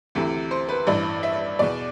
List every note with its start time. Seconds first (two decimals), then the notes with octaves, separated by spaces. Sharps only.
0.15 D2 C3 E3
0.51 C5
0.69 B4
0.87 A1 G2 E3 D5
1.23 E5
1.59 E2 B2 D5